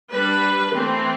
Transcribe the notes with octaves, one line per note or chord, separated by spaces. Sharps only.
G3 D4 B4
E3 A3 C4